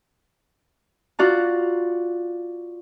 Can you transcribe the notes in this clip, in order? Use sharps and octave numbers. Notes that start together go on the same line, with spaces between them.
F4 F#4 D5 A#5